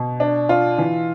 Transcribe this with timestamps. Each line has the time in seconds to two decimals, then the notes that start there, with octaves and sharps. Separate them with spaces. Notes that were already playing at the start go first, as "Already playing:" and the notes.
Already playing: B2
0.20 D4
0.49 F4
0.78 E3